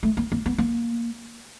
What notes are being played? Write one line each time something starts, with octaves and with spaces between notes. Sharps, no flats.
A3
A#3
A#3
B3
A#3